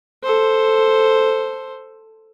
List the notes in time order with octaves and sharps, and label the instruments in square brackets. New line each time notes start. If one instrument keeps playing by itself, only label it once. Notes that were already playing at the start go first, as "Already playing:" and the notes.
[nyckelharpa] A4 C5